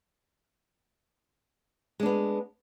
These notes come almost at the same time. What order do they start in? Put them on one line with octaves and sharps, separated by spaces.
G#3 D4 B3